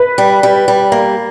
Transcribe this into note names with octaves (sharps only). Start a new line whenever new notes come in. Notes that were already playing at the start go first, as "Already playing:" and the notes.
Already playing: B4
G3
G3
G3
A#3